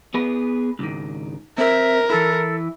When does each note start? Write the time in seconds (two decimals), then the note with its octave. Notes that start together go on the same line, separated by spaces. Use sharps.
0.14 B3 G#4 B4
0.79 C#2 G#2 D#3
1.58 C4 A#4 E5
2.10 E3 E4 A4